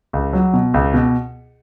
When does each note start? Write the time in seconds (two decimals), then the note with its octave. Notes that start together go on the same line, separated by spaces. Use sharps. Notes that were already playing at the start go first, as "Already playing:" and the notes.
0.13 C#2
0.33 F#3
0.53 B2
0.74 C#2
0.94 B2